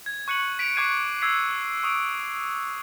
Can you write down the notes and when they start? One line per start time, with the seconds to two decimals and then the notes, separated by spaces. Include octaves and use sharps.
0.06 G#6
0.28 C#6 F#6 C#7 D#7 F#7
0.59 B6 D7 F7
0.76 C#6 D6 F#6 G#6 C7 D#7
1.22 E6 G#6 B6 C7 F7
1.83 C#6 D#6 D7